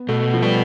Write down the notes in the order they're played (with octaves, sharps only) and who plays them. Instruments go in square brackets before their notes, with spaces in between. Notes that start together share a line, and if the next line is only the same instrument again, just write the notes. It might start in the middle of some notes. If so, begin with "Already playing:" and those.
Already playing: [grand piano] B3
[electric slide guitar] B2 [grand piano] A3
[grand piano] F3
[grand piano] G3 [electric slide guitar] B4